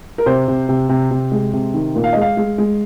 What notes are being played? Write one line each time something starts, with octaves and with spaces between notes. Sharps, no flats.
A#4
C3 C5
C3
C3
C3
C3
G#3
C3
D#3
A#2
F5
G#3 D#5
F5
G#3
G#3